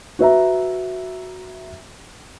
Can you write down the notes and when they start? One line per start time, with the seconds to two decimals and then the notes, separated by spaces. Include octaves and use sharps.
0.19 F#4 B4 E5 A#5